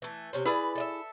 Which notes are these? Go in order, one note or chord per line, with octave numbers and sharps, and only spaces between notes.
E3 A3
C3 C#4 C5
E4 G#4 B4 D5
A4 D#5 E5